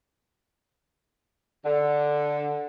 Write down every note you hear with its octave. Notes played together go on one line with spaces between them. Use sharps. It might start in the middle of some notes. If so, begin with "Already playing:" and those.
D3